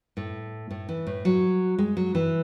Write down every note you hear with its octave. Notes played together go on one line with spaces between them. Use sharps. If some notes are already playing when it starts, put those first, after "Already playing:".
A2
A2
E3
A2
F#3
G#3
F#3
E3